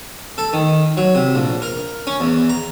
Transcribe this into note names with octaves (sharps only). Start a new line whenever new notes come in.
A4
D#3
F#3
C3
A#1
A#4
C#4
E2
A#5